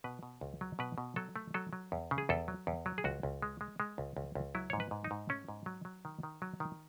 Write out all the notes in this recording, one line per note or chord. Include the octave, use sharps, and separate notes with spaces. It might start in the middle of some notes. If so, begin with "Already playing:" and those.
B2 B4
B2
C#2
F#3
B2 B4
B2
F#3 A4
A3
F#3 A4
F#3
E2
C#3
G#4
E2 A4
F#3
E2
F#3
G#4
C#2 F#4
C#2
G#3
G#3
G#3
C#2
C#2
C#2
F#3 E4
G#2 C#5
B4
G#2
D#4
G#2
A3 C#4
G#2
F#3
F#3
D#3
D#3
F#3
D#3